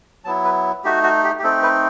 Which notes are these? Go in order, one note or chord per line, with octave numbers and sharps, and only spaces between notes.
F#3 B3 E4 A5
B4
A3 D#4 F#4 G4
F#4
G4
G4
A3 C4 D#4 A4
B4